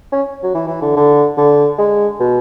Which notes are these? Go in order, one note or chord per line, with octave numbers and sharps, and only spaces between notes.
C#4
F#3
E3
E3
D3
D3
D3
G#3
B2